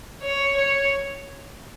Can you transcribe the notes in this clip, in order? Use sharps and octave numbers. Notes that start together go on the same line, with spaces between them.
C#5
C#5